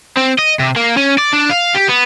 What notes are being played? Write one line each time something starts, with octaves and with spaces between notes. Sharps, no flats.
C4
D#5
C3
A#3
C#4
D5
D4
F5
G4
B3